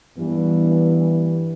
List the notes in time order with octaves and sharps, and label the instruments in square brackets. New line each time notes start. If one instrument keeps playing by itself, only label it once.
[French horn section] G2 E3 B3